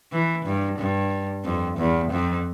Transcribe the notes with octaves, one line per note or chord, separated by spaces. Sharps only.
E3
G2
G2
F2
E2
F2